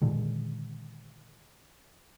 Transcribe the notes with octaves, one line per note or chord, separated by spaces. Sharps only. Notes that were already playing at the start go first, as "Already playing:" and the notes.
A#2 D3 D#3 G#3